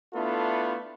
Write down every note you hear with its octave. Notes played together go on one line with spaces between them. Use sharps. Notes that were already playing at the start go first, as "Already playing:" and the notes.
A3 B3 D4 E4 F4 A4